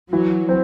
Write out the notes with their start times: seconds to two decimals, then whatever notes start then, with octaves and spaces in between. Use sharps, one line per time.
0.12 E3 F#3
0.49 C4